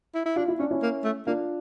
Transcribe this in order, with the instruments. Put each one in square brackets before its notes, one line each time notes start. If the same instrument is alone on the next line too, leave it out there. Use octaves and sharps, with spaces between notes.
[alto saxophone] E4
E4
[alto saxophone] D4 [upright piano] F4
[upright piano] E4
[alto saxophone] C#4 [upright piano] D4
[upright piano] C#4 E4
[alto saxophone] A#3
A3
[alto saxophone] A#3 [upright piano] D4 F4